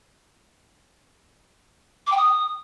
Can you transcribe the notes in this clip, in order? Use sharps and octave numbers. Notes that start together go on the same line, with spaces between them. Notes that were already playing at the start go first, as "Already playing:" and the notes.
D6
G5
D#6